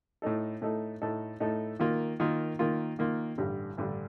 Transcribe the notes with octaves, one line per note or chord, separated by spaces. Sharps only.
A2 A3 D#4 A4
A2 A3 D#4 A4
A2 A3 D#4 A4
A2 A3 D#4 A4
D#3 A#3 F4
D#3 A#3 F4
D#3 A#3 F4
D#3 A#3 F4
A1 G2 D3 G3
A1 G2 D3 G3